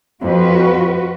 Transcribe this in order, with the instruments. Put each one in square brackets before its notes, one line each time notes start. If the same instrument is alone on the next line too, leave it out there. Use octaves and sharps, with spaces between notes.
[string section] F2 [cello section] F4 F#4 B4